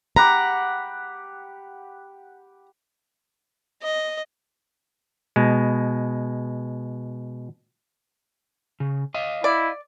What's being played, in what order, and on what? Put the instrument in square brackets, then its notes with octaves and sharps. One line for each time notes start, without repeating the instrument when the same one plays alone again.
[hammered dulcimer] G4 F#5 B5 [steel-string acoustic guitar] A#5
[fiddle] D#5
[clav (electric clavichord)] B2 G#3
[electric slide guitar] C#3
D#5 F5
[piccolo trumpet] E4 [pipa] D5